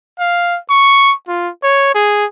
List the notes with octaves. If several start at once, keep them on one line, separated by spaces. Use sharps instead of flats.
F5
C#6
F4
C#5
G#4